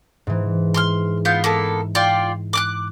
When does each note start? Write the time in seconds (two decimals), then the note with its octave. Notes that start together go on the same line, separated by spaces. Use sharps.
0.27 G#2 E3
0.74 C6 C#6 F6
1.25 B3 F4 G6
1.44 A#3 B3 A4
1.95 F4 D5 G5
2.53 D6 F6 F#6